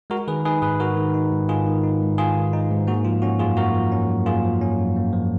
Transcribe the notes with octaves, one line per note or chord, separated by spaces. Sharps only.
G#3 F#4 A#4
D#3 G#4 B4
D#4 G#4 B4
G#2 G#4 B4
G#3 F#4 A#4
D#3
D#4
G#2
G#3 F4 G#4
D#3
D#4
G#2
G#3 F4 G#4
D#3
D#4
G#2
A#3 F#4
F3 F4
C#4 F#4
F#2 F4 G#4
A#3 F#4 A#4
F3
C#4
F#2
A#3 F4 G#4
F3
C#4
F#2
A#3
F3